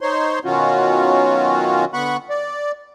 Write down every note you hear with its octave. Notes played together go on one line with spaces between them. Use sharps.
D#4 C5 C#5 C6
B2 D#3 F#3 C#4 F4 F#4
D3 B3 F#5 B5 C#6 F#6
D5